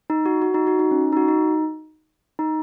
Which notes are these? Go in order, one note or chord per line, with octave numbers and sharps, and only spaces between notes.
D#4
F#4
F#4
D#4
F#4
D#4
C#4
D#4
F#4
D#4
D#4